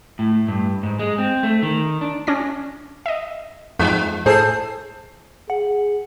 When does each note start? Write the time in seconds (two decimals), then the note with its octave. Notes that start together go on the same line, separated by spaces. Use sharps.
0.19 A2
0.48 G2
0.83 G#2
0.99 G#3
1.18 C4
1.43 A3
1.62 D#3
2.01 D4
2.27 C#4 D4 A#6
3.06 D#5 E5
3.79 F2 G#2 G#3
4.26 A2 G#4 A4 C5
5.50 G#4 F#5